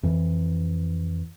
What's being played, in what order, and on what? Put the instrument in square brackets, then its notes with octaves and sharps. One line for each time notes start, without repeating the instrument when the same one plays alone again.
[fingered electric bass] F2 E3